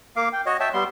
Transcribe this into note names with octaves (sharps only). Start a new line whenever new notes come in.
A#3 F5 D6
G5
F#4 C#5 D#5
C#5 E5 G5 A5
G3 B3 C6